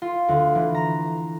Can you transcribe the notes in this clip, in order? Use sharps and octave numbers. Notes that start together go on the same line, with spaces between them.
F4
D2
E3
A#5